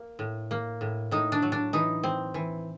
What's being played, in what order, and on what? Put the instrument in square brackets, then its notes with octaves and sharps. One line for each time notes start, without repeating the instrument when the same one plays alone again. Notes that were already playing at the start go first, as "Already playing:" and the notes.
Already playing: [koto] A#3
A2
A#3
A2
A2 D#4
D4
F#3
D4
E3 D#4
C4
E3